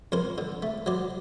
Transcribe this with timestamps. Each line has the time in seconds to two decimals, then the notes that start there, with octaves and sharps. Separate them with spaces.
0.12 F2 A#4 C5
0.38 D3
0.63 A3
0.86 F#3 C5 D5